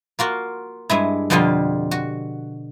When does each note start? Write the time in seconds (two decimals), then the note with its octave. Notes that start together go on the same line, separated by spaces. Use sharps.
0.19 A#3 F4 F#4
0.90 G2 G#3 E4
1.30 F2 B2 D3 G3 F4
1.91 F#4